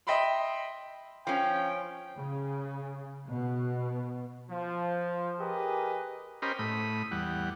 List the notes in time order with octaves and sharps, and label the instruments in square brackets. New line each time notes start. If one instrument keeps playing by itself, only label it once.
[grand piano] D#5 E5 G5 B5 C6
[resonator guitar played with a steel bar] F3 C#4 [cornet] G5
[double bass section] C#3
B2
[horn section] F3
G4 G#4 A#4 B4 D#5
[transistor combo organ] C#4 G4 A#4 C5 D#5 B5
A2 B5 D#6
E2 G3 F#5